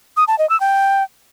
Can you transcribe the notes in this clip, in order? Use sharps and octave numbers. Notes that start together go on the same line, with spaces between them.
D#6
A5
D#5
E6
G5